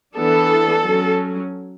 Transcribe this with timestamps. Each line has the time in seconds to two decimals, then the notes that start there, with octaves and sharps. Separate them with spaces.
0.17 E3 B3 D4 A4
0.84 F#3 C#4